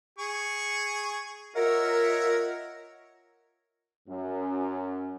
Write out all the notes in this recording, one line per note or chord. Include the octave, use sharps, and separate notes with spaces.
G#4 C#6
F4 A#4 C#5 D#5 E5 F#5
F#2